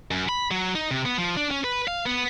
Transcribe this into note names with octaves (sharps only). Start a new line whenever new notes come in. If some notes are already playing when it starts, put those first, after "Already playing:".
F#2
B5
F#3
D#4
C3
B3
F3
D4
C#4
B4
F5
B3